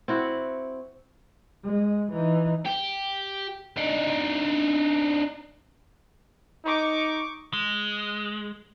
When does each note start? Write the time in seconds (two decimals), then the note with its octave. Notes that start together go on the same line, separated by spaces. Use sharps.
0.08 C4 E4 F#4 F#5
1.65 G#3
2.13 E3 D#4
2.66 G4
3.77 D4 D#4
6.64 D#4 C#6 D6
7.53 G#3